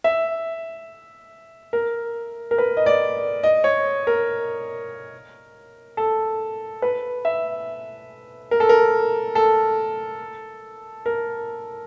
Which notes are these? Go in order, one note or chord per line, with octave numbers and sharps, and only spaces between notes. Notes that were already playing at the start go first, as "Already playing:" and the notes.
E5
A#4
A#4
B4
D#5
D5
D#5
C#5
A#4
A4
B4
E5
A#4
A4
A#4
A4
A#4